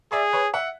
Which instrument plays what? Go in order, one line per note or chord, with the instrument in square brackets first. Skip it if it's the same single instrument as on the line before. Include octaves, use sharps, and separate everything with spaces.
[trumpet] G#4 [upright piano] D5 E5
[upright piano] B4 C#5
E5 F#5